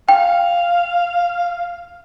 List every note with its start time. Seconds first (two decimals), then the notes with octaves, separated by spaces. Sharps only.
0.09 F5 G5